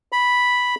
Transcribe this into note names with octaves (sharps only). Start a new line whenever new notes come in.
B5